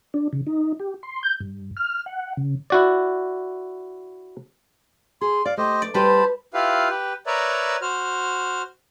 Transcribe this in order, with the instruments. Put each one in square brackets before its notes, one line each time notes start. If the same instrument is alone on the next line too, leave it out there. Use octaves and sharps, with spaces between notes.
[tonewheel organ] D4
C#3
D#4
G4
C6
G6
G2
F6
F#5
C#3
[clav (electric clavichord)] E4 F#4 D5
[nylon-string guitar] G#4 [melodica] C6
[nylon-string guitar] D5 [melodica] F5
[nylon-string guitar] A3 [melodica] G4 C5 D#5
[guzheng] D5
[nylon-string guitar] G3 G4 [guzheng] B4 [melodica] C5 A5 B5
[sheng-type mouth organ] E4 F4 G4 B4 F5
G4 B4
A#4 B4 C#5 D5 E5 A#5
F#4 C5 F6